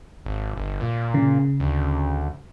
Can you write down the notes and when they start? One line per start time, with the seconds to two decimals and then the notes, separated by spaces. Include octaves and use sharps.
0.26 G#1
0.57 G1
0.81 A#2
1.14 C#3
1.60 D2